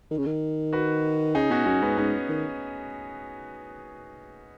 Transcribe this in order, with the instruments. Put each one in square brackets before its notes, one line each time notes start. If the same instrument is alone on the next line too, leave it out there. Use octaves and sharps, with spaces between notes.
[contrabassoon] D#3
C#3
D#3
[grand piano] F#4 B4
[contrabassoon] C#3 [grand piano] D#4 G#4
[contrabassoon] B2 [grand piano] C#4 F#4
[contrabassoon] F#2 [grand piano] C#4
[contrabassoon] G#2 [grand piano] B3
[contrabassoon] G#2 [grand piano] C#4
[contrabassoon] D#3